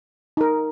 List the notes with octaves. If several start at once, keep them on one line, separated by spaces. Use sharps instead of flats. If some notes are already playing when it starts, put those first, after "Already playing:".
D#4 A#4